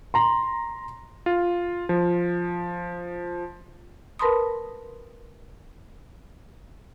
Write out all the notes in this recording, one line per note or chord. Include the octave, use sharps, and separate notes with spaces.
A#5 C6
F4
F3
A#4 B4 A5 B5 C6 D#6